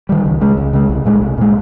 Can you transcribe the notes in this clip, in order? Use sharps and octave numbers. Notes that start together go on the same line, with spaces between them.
D#3 G3
C#2
C#3 G#3
C#2
C#3 G#3
C2
A#2 G#3
C2
A#2 G#3